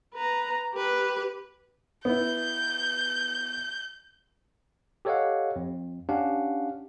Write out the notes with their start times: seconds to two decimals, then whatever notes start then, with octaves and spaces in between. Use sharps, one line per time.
0.14 B4 A#5
0.74 G4 B4
2.05 B3 E4 G6
5.05 G4 A4 C#5 D#5 F5 F#5
5.56 F2
6.09 C#4 D4 G4 F5 F#5